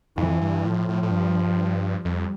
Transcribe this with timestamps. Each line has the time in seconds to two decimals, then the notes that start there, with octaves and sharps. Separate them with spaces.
0.17 F2 E3
0.41 G2
0.65 A2 F3
0.89 A2
1.03 A2
1.11 G2
2.05 F2 G3